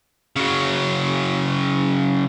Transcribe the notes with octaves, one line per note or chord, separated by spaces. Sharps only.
C#3 F#3